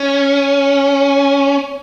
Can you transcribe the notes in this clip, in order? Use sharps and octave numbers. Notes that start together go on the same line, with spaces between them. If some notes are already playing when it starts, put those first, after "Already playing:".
Already playing: C#4